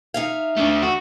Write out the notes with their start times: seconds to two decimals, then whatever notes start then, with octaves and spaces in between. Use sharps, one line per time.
0.14 D#4 E5 F5
0.57 D3 A3
0.82 F#4